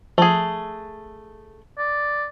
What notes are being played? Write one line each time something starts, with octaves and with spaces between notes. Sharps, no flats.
F3 A3 G#4
D5